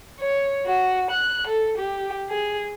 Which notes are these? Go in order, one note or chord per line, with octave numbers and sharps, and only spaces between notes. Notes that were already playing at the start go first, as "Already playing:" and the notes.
C#5
F#4
F#6
A4
G4
G#4